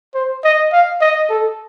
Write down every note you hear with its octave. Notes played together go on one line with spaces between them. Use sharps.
C5
D#5
F5
D#5
A4